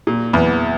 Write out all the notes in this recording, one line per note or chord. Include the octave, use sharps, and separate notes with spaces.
A#2
E2